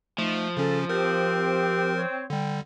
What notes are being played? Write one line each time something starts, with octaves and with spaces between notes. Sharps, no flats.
F3 A3 D#4
C#3 C#4 A4
C4 G4 A#4
C#5
D3 G3 G5